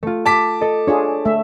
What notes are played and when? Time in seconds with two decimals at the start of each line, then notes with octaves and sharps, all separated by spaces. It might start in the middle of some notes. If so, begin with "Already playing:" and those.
0.03 A3 F4
0.26 A5 D6 B6
0.61 A4 D#5
0.87 D4 F4 G#4 C#5
1.25 A3 E5